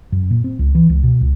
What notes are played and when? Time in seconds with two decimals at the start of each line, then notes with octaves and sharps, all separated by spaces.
0.12 F#2
0.30 A#2
0.44 C4
0.59 C#2
0.75 E3
0.89 C#2
1.03 B2
1.21 C#2